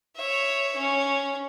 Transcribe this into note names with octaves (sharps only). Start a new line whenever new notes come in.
C#5 E5
C#4